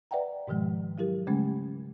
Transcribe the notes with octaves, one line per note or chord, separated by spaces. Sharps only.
B4 D5 E5 F#5 G5 A#5
G#2 B2 D#3 F3 G#3
F#3 E4 G4 A#4
C#3 G#3 A3 C#4